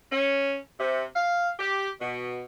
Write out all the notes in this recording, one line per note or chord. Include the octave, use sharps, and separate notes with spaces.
C#4
C3
F5
G4
B2